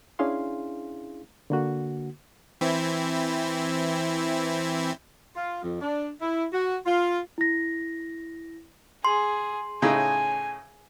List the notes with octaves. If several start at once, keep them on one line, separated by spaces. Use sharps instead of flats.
C#4 D4 E4 G#4 F5 C6
D3 A#3 F#4
E3 C4 E4
F4
F2
D4
E4
F#4
F4
E4 A#6
G#4 C6
A2 C#3 D#4 G#5